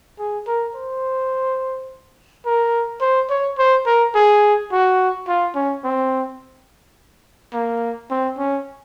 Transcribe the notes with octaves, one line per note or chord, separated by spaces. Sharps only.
G#4
A#4
C5
A#4
C5
C#5
C5
A#4
G#4
F#4
F4
C#4
C4
A#3
C4
C#4